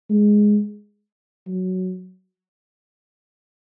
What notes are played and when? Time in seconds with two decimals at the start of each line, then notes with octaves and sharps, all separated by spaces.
0.10 G#3
1.47 F#3